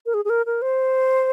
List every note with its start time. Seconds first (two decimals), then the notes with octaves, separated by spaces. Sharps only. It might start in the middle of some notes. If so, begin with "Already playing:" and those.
0.06 A#4
0.14 G#4
0.25 G#4
0.30 A#4
0.46 A#4
0.62 C5